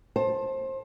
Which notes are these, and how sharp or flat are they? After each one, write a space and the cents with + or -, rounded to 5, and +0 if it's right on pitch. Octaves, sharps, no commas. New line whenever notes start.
C5 +25 A5 +0